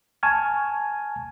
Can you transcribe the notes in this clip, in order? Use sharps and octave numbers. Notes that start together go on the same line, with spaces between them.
G#5 A5 C#6 F6 G#6